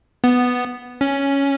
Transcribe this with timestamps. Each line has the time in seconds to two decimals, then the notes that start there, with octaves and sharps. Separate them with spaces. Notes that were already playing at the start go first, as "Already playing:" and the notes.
0.24 B3
1.01 C#4